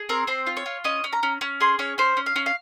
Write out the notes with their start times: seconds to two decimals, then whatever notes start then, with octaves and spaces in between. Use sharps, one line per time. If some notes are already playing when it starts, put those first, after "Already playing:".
Already playing: G#4
0.09 C4 A#4
0.27 C4 C5
0.47 F4
0.57 C#5
0.66 F4
0.84 C#4 D#5
1.04 C#4
1.13 A#5
1.23 C#4
1.41 C#4
1.60 G#4 C6
1.79 C#4 C#5
1.98 C#4 C5
2.17 C#4
2.26 F5
2.36 C#4
2.46 F5